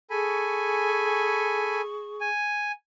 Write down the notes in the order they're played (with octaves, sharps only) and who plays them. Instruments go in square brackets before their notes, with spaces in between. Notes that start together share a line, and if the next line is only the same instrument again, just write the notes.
[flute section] G#4 C#6 [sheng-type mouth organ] A4 G#5 B5
[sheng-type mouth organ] G#5